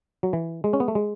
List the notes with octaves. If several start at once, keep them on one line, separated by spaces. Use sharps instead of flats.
F#3
E3
G#3
C#4
B3
A3
G#3